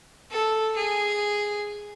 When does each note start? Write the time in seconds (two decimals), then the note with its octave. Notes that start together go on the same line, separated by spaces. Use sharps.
0.31 A4
0.76 G#4